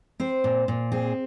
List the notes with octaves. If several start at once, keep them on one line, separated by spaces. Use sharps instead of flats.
C4 C5
A#2
A#2
C4 G#4